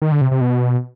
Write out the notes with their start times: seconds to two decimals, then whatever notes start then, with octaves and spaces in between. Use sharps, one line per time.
0.02 D#3
0.12 D3
0.21 C3
0.31 C3
0.41 B2